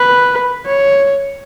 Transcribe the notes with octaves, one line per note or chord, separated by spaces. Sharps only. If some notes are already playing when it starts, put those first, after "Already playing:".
Already playing: B4
C#5